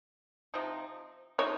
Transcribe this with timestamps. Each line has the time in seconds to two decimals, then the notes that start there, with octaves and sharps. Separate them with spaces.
0.54 C3 F3 C4 D#4
1.38 C3 F3 C4 D#4 C#5